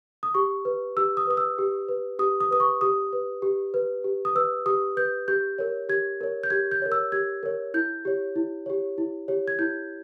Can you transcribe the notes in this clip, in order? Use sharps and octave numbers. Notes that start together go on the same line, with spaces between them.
D#6
G4 C#6
B4
G4 E6
D#6
B4 D#6
E6
G4
B4
G4 D#6
D#6
B4 D#6
C#6
G4 D#6
B4
G4
B4
G4
D#6
B4 E6
G4 D#6
B4 G6
G4 G6
A#4 C#5
G4 G#6
A#4 C#5
G6
G4 G#6
G6
A#4 C#5
E6
G4 G#6
A#4 C#5
E4 G6
G4 C#5
E4
G4 C#5
E4
G4 C#5
G#6
E4 G6